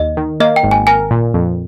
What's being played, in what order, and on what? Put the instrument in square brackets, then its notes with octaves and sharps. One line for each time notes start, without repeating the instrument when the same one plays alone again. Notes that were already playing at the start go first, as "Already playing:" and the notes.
Already playing: [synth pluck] D#2 [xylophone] D#5
[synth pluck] D#3
[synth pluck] A#3 [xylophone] D#5
[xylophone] G5
[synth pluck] G#1
[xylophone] G#5
[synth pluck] A#4 [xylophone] G#5
[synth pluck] A#2
F2